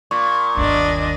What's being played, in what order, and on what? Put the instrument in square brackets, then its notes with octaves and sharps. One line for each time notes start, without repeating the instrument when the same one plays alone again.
[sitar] A#2 [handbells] C#6
[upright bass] G1 D#2 [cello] D4 D#5